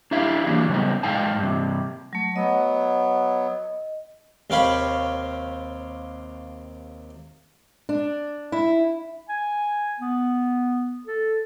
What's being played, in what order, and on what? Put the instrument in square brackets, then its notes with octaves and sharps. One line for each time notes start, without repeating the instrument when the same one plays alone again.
[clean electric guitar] D4 E4 G4 E5 F5
E3 G3 A#3 D4
C#3 G3 B3 D#4
G#2 D#4 F5 G5 A5
G2 C3
[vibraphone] F#3 A3
[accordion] F#3 B3 [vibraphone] D#5
[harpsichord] D#2 C3 C4 C#5 F5 B5
[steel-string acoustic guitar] D4
E4
[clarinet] G#5
B3
A4